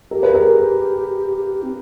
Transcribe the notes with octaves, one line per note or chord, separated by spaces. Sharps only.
G4 A#4
B4
G#4 A#4
C4